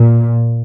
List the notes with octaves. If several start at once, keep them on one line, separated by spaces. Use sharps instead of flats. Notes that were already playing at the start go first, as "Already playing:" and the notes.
Already playing: A#2